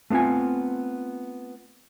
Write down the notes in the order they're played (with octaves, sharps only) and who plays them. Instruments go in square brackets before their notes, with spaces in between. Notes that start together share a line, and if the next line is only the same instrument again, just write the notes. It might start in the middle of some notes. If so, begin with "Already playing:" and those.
[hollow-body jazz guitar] A3 B3 C4 F4 G#5